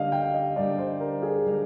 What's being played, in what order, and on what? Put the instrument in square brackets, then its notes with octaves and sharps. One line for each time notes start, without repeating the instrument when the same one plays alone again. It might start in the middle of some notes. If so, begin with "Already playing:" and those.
Already playing: [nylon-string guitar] D3 G3 A#3 D#4 [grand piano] D#5 F5
[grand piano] G5
D#5
[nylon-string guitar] D3 G3 A#3 D#4 [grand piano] D5
[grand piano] C5
A#4
G#4
[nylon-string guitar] D3 G3 A#3 D#4